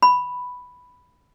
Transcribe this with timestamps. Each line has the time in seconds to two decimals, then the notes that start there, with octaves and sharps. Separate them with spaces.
0.03 B5